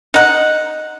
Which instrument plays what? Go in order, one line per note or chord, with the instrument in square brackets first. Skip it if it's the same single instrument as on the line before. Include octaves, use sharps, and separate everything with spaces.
[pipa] D#4 F#5